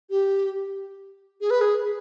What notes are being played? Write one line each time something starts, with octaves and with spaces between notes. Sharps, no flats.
G4
G#4
B4
G#4